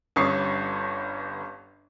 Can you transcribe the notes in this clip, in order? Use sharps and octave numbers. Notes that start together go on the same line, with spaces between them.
G1 G2 C#4 C#6 D#6 C7